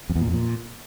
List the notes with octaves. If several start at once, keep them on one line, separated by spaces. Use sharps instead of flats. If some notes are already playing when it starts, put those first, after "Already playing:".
F2
E2
A#2
F2
A#2